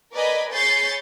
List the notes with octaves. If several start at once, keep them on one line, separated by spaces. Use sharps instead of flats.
A#4 B4 D5 D#5 G#5 B5
G#4 C#5 B5 G6 A6 C7